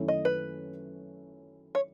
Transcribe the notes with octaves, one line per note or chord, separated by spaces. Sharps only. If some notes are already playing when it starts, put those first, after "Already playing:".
Already playing: F#2 D#3 A3 C#4 E4
D#5
B4
C#5